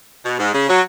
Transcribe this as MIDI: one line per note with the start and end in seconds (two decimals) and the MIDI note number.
0.24 0.39 47
0.39 0.49 44
0.53 0.64 49
0.69 0.81 54